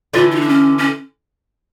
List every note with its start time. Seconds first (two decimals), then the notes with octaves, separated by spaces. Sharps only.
0.13 D3 E3 F4
0.32 F4
0.36 D#4
0.41 D4
0.49 C#4
0.78 C#4